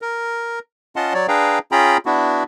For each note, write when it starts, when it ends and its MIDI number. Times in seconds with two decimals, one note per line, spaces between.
0.02 0.59 70
0.96 1.13 61
0.96 1.13 65
0.96 1.13 75
0.96 1.13 78
0.96 1.13 81
0.96 1.13 84
1.14 1.27 54
1.14 1.27 73
1.14 1.27 74
1.28 1.59 62
1.28 1.59 68
1.28 1.59 71
1.28 1.59 77
1.28 1.59 79
1.28 1.59 82
1.72 1.97 61
1.72 1.97 65
1.72 1.97 68
1.72 1.97 79
1.72 1.97 82
1.72 1.97 83
2.06 2.43 59
2.06 2.43 62
2.06 2.43 64
2.06 2.43 66